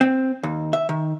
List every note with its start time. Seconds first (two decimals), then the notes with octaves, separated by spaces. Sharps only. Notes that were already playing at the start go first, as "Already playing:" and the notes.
0.01 C4
0.43 D#2
0.73 E5
0.89 D#3